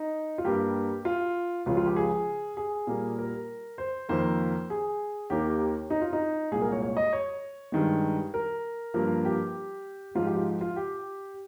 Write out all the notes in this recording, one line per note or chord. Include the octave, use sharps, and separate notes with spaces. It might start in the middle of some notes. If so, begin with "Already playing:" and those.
Already playing: D#4
F4
G2 G3 A#3 G4
F4
C#2 C#3 F3 F4
F4
G4
G#4
G#4
A#2 G3 A#3
A#4
C5
F2 D#3 A#3 C5
G#4
D#2 D#3 A#3 G4
D#4
F4
D#4
C2 A#2 G#3 G#4
A#4
C#5
C#5
D#5
C#5
G2 D#3 G#3
A#4
G2 F3 A#3
G4
G#2 F3 G#3 F4
G4
F4
F4
G4